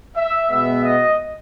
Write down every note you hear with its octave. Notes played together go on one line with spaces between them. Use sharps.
E5
B2 G#3 B3 E5
D#5